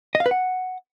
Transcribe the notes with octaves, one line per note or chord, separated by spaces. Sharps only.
D#5
F5
B4
F#5